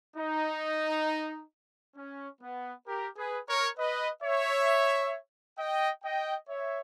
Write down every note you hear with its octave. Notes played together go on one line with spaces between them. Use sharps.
D#4
C#4
B3
G4 A#4
G#4 B4
A#4 C#5
B4 D#5
C#5 E5
D#5 G5
D#5 G5
C#5 E5